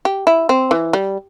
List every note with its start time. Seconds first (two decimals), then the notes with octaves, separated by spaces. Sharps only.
0.05 G4
0.27 E4
0.49 C4
0.71 E3
0.93 G3